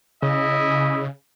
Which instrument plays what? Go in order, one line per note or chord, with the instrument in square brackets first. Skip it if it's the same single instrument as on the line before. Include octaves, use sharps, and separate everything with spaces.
[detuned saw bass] C#3 [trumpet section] E4 D#5